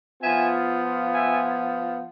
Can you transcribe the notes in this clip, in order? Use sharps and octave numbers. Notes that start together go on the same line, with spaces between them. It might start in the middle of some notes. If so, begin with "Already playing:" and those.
F3 B3 F4 E5 G#5
E5 G#5